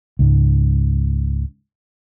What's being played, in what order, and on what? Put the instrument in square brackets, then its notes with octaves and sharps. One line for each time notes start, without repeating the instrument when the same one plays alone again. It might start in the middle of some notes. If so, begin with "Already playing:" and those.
[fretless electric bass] C#2 G#2